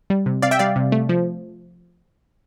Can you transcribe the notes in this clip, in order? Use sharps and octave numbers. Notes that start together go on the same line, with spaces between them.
G3
C3
C3 D5 F5
E5 G5
G3 D5 F5
C3
A3
F3